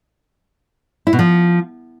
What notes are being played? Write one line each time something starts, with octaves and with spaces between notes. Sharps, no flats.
E4
B2
F3